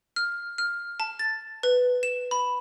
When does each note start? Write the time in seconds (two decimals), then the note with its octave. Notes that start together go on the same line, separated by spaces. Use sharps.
0.16 F6
0.58 F6
1.00 A5
1.19 A6
1.63 B4
2.03 E7
2.31 B5